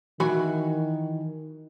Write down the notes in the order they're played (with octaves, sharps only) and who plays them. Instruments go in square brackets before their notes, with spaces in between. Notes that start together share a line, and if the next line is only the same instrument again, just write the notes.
[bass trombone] D#3 [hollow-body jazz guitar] E3 F#4 B5